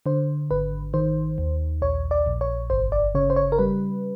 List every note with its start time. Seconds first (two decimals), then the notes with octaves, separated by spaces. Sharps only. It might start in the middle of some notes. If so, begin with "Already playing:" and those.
0.06 D3 C5
0.51 G#1 B4
0.94 D#3 C5
1.38 D#2
1.82 A#1 C#5
2.11 D5
2.26 A#1
2.41 C#5
2.70 G1 C5
2.92 D5
3.15 C#3 C#5
3.30 C5
3.36 C#5
3.52 A#4
3.59 G3 B4